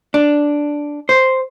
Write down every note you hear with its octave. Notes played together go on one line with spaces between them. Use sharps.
D4
C5